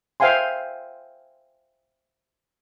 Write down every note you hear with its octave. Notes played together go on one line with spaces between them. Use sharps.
C5 E5 F5 G5 G#5 C6